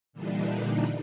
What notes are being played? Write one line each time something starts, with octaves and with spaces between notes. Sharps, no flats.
A#2 D3 E3 G3 D4 D#4